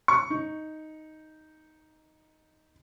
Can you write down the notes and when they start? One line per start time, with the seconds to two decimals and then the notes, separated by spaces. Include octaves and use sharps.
0.08 C#6
0.30 D#4